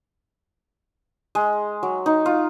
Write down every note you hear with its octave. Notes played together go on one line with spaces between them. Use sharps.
G#3
F#3
D#4
F4